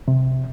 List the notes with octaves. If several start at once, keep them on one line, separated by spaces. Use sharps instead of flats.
C3